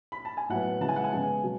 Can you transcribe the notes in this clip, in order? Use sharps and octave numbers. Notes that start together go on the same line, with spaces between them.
B5
A5
G#5
A2 F#3 B3 F#5
C#3 E3 G#3 B3 A5
G#5
F#5
G#5
C#3 G#3 B3
B2 F#3